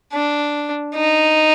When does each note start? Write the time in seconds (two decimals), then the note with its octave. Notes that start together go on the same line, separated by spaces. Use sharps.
0.13 D4
0.96 D#4